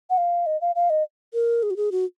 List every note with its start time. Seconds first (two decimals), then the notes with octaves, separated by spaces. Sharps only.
0.10 F#5
0.18 F5
0.46 D#5
0.61 F5
0.75 F5
0.90 D#5
1.34 A#4
1.63 G#4
1.70 F#4
1.76 G#4
1.92 F#4